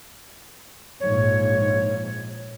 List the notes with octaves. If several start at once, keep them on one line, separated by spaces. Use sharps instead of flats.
A#1 G#2 C#5